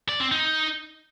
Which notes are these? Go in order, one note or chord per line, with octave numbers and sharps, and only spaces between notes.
D5
C4
D#4